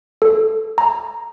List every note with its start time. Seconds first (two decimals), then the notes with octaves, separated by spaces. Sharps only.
0.22 A4
0.78 A#5